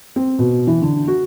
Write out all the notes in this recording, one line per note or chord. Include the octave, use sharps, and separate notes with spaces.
C4
B2
E3
D3
F#4